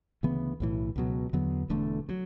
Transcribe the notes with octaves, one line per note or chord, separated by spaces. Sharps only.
D2 C#3 E3 B3
B1 A2 E3
C#2 B2 F#3
E2 D3 F#3 B3
E1 E2 D3 A3
B2 F#3